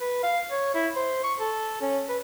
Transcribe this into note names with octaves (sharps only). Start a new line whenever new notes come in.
B4
F5
C#5
E4
C5
C#6
A4
C#4
B4